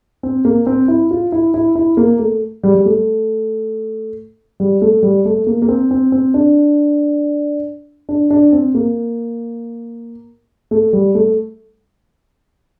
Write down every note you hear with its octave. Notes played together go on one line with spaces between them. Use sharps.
C4
A#3
C4
E4
F4
E4
E4
E4
A#3
A3
G3
G3
A3
G3
A3
G3
A3
A#3
A#3
C4
C4
C4
D4
D4
D4
C4
A#3
A3
G3
A3